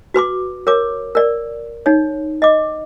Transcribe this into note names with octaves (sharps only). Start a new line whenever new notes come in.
F#4 B4 C6 D6
A#4 C#5 D6
A#4 D5
D#4 C#5
D#5 D6